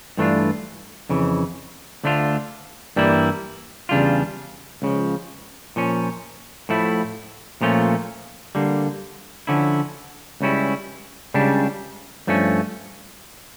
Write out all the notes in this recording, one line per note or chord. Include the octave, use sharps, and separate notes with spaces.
G2 E3 A3 D4 F4
F2 C#3 E3
D2 D3 A3 D4 F4
G2 E3 G3 A#3 E4
E2 C#3 G3 D4 F4
C#2 C#3 F3
A#2 F3 C#4
A2 F3 A3 E4
A#2 F3 A3 C#4 F4
D3 G3 A#3
D3 F3 C#4 E4
C#2 C#3 G3 C#4 E4
C#2 C#3 G3 D4
G2 F3 A3 C#4